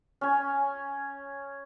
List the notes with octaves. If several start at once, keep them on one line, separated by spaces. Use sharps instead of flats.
C#4 G#5